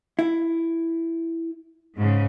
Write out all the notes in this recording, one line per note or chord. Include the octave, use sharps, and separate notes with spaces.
E4
G#2 C#3